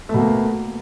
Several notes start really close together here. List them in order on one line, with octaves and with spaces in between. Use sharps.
A3 B2 A#3